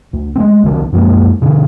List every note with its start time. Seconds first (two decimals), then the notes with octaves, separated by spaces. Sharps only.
0.13 D2
0.36 G#3 A3 C4
0.63 C2 D3 D#3 F3
0.92 F#2 F3 G#3 A#3
1.42 B2 D3 C#4